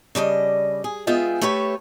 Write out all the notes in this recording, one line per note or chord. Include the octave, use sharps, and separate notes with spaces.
C#3 G3 D4 D#5
G#4
G#3 B3 F4 G#4 E5 G5
A3 G4 A4 B4 C#5